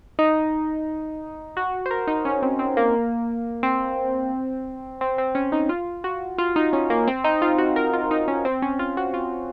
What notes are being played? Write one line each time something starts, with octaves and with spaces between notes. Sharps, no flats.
D#4
F#4
C5
A#4
D#4
C#4
C4
C4
A#3
C4
C4
C4
C#4
D#4
F4
F#4
F4
D#4
C#4
A#3
C4
D#4
F4
F#4
A#4
F4
D#4
C#4
C4
C#4
F4
F#4
F4